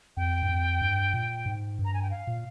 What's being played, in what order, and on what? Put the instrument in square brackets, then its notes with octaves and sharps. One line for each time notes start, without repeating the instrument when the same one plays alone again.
[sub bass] F2 [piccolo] G5
[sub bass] G2
F2
G2
A#2
G#2
G2
[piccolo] A#5
G#5
G5
F5
[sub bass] A#2